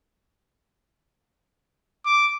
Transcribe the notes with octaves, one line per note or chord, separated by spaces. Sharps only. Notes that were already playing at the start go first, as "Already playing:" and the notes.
D6